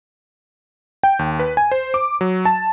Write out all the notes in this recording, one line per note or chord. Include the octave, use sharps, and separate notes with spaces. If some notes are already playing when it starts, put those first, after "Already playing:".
G5
D#2
B4
G#5
C5
D6
F#3
A5